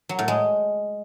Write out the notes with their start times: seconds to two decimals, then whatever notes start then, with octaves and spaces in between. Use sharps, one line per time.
0.09 F#3
0.19 A2
0.28 G#3